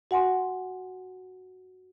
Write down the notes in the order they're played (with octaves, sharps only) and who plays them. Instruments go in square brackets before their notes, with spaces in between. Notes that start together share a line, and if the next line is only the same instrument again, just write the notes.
[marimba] F#4 F#5 G#5 C6